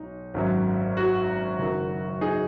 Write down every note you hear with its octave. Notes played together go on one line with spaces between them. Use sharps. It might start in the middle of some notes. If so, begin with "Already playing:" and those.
Already playing: B1 D#4
G#1 F#2 F#3
F#4
F#1 F#2 D#3 F#3
D#4 G#4